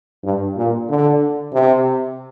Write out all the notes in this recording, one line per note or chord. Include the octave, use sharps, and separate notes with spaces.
G2
A#2
D3
C3